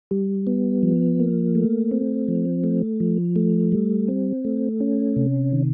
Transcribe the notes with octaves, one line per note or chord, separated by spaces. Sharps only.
G3
B3
F3
A#3
A3
C4
F3
A3
F3
A3
G3
C4
A3
C#4
C3
D#3